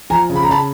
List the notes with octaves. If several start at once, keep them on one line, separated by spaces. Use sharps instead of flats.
F3 G#5 A#5
C#3
B5
A#5
C#3 A5 B5